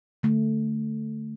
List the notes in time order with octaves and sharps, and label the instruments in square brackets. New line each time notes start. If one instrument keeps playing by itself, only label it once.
[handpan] D3 A3